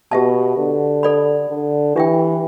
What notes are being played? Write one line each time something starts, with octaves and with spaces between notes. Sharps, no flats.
B2 G4 E5 A5
D3
A4 D5 B5
D3
E3 D4 G4 E5 G5